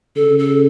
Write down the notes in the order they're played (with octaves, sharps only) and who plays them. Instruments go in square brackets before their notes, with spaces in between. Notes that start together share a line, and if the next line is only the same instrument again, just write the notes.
[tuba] C#3 [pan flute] A4
[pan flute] A4